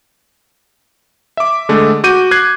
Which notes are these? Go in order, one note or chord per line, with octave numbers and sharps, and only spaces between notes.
E5 D6
D3 G#3 A3
F#4 D6 G6 D#7
F#6 G#6 C7